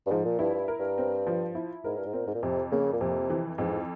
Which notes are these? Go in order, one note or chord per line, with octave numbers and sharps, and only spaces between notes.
G2
G#2 F3
A#2
G2 E4
G2
A#4
G2
C4
F3
E4
G#2 A#4
G2
G#2
A#2 C4
G#2
A#2
F2 C3
C#3 A#3
A#2
F2 C3
E3
F2 G#2